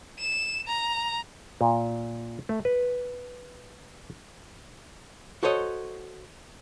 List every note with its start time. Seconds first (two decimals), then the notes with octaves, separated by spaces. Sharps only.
0.19 E7
0.67 A#5
1.61 A#2
2.49 A3
2.65 B4
5.43 F#4 A4 C5 C#5 D#5